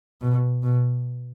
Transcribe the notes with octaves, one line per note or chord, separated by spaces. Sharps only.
B2
B2